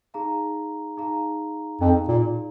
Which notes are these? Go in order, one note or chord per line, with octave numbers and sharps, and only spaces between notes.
D#4 G#4 F5 A#5
D#4 G#4 F5 A#5
F2 D#4 G#4 F5 A#5
A#2